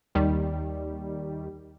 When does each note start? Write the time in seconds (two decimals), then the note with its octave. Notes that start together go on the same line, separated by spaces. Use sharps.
0.15 D#2 D#3 G3